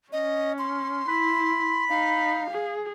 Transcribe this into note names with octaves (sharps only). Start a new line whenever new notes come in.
C#4 D#5
C6
E4 B5
D#4 F5
G#4